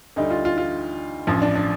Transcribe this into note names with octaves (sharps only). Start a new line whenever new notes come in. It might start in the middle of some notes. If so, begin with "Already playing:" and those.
D2 D3 G3 D#4
F4
F4
F4
A1 G2 F3
D4
D4